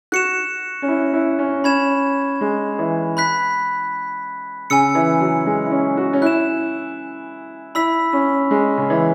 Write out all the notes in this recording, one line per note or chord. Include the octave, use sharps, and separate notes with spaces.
F#4 F#6 C#7 E7
C#4
E4
E4
C#4
C#4 B5 G#6 E7
G#3
E3
B5 F#6 B6
C#3 G#5 E6 C#7
E3
F#3
G#3
E4
C#4
F#4
C#4
E4 F#6 E7
E4 B5 E6 B6
C#4
G#3
C#3
E3